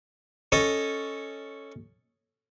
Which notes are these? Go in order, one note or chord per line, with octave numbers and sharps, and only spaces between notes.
C#4 A4 D#5